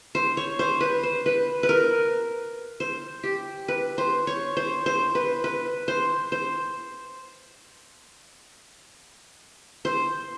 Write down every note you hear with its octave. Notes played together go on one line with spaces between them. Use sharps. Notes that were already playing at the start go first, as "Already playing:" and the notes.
C5
C#5
C5
B4
C5
B4
B4
A#4
C5
G4
B4
C5
C#5
C5
C5
B4
B4
C5
C5
C5